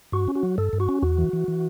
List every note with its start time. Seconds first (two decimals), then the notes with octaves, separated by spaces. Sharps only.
0.12 G2 F#4
0.28 C#4
0.35 F#4
0.43 F#3
0.58 G2 A4
0.73 G2
0.80 F#4
0.89 C#4
1.02 E2 F#4
1.18 E3
1.33 E3
1.48 E3